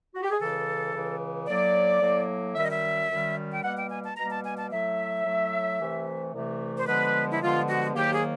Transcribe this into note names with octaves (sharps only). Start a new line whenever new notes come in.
F#4
G4
G#4
C#2 C#3 E3 A4
C#2 C#3 E3
A2 F#3 A#3 D5
A2 F#3 A#3
F#2 D#3 G3 E5
D#5
E5
F#2 D#3 G3
G5
B2 G3 A#3 F#5
G5
G#5
A5
B2 G3 A#3 A#5
A5
G#5
A5
A2 F#3 A3 E5
A2 F#3 A3
C2 C3 E3 A3
C2 C3 E3 A3
C5
G2 D3 F3 G#3 B3 B4
E4
G2 D3 F3 G#3 B3 F4
F#4
G#2 D#3 F#3 A#3 G4
G#4